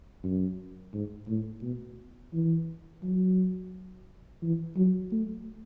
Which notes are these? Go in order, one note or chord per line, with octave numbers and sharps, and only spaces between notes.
F#2
G#2
A2
B2
E3
F#3
E3
F#3
A3